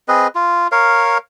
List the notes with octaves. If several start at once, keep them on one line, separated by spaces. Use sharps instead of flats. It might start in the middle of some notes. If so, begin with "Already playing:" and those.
C4 G#4 B4 D#5
F4
A#4 C#5 F5